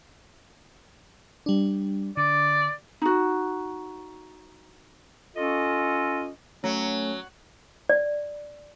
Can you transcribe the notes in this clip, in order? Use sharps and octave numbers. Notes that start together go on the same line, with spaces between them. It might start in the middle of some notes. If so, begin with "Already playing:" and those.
G3 D4
D3 D5 D6
D#4 F#4
C#4 F4 A4 D#5
F#3 A3 C#4
D5